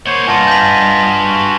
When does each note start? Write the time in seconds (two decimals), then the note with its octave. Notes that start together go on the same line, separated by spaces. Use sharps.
0.07 A#3 C5 C#5 F#5
0.27 G2 B3 F4 D#5 G#5 A5 C6
0.47 G6 B6
1.24 F#4